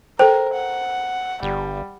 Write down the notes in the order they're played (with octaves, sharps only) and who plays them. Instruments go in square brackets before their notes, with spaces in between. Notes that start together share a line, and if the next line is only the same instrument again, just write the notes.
[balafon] A4 G5 [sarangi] A#4 [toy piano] C5
[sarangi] F#5
[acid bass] G1 [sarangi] G3